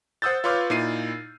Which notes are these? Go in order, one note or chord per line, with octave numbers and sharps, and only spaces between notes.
C5 F#5 D#6 E6 G6 A6
F4 B4 C#5 C6 D6 F6
A#2 D#4 E4 C7 D#7